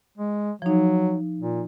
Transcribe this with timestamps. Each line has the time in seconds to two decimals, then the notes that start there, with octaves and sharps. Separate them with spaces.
0.18 G#3
0.62 F3 F#3 D#4
1.39 A#2